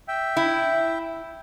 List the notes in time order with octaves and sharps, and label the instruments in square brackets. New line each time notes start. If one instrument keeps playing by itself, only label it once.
[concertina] E5 G5
[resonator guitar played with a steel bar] E4